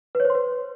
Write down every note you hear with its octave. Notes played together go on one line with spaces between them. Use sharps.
B4
C#5
C5
C6
B4